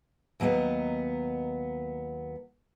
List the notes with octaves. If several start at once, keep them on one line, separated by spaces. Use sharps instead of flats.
D#2 F#3 A#3 B3 D#5